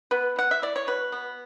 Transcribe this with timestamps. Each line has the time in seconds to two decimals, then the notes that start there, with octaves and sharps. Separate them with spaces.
0.11 B3 B4
0.36 E3 F#5
0.51 E5
0.62 E4 D5
0.76 C#5
0.87 B2 B4
1.12 B3